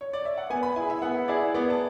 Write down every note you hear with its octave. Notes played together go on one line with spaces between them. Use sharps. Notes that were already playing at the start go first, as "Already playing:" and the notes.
C#5
D5
E5
F#5
B3 G#5
B5
E4 G#4 G#5
E5
B3 F#5
E4 G#4 D5
B3 D5
A5